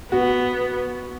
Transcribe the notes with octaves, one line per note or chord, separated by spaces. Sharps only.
B3 F#4